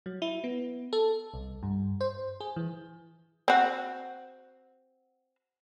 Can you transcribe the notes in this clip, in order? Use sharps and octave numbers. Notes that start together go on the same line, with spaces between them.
F#3
E4
B3
A4
C2
G2
C5
G#4
E3
C4 F#4